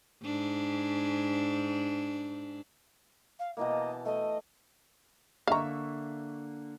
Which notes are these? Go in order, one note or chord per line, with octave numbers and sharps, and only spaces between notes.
G#2 D4
F5
B2 E3 A#3 D#5
A5
A3 D#5
D3 A#3 E5 F5 A#5 C#6